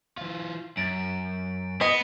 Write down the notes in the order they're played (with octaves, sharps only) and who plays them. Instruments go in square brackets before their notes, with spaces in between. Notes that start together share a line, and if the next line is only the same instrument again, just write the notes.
[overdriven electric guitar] E3 F4
[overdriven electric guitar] F#2 [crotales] A6 D7
[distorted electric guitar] B3 [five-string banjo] D#5 [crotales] C7